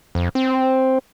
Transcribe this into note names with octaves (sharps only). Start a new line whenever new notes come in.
F2
C4